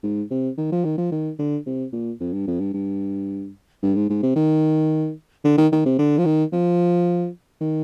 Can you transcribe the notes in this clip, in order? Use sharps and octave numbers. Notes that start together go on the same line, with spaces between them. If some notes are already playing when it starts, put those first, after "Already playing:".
G#2
C3
D#3
F3
D#3
F3
D#3
D3
C3
A#2
F2
G2
F2
G2
G2
G2
G#2
G#2
C3
D#3
D3
D#3
D#3
C3
D3
F3
D#3
F3
D#3